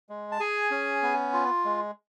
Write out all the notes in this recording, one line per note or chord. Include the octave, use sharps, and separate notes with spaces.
G#3
A5
G#4 G#5
C#4
B3
F4
G#3